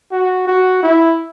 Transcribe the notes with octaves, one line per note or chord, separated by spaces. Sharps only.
F#4
F#4
E4